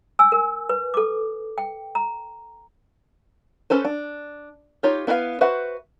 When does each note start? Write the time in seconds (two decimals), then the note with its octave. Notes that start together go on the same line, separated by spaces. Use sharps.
0.19 G#5 E6
0.32 A#4
0.69 B4
0.94 A4 D6
1.58 G5
1.95 A#5
3.70 C#4 A4 B4 C5
3.85 D4
4.83 D#4 F4 G4 C#5
5.07 B3 E4 B4 C#5 F5
5.41 F#4 B4 C5 E5 F#5